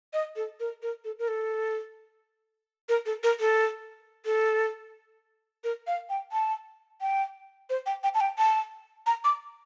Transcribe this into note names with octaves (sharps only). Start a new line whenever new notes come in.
D#5
A4
A#4
A#4
A4
A#4
A4
A#4
A4
A#4
A4
A4
A#4
F5
G5
A5
G5
C5
G5
G5
A5
G5
A5
A#5
D6